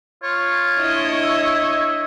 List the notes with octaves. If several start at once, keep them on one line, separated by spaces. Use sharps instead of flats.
F4 C#5
D4 E4 D#5
E5